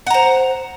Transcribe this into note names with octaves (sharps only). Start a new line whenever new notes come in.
C5 F#5 A#5